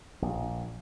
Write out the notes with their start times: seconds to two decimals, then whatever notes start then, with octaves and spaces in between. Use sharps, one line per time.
0.22 A#1